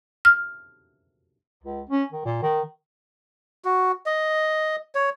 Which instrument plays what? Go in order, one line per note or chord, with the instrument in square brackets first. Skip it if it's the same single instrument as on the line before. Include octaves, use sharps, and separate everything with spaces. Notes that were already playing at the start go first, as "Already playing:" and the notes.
[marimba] F6
[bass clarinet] C#2
C#4
D#3
A#2
D#3
[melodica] F#4
D#5
C#5